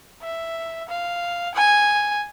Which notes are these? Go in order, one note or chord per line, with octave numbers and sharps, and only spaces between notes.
E5
F5
G#5